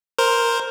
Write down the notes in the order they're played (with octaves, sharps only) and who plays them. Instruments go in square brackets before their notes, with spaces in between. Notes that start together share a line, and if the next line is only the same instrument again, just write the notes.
[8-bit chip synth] A#4 C5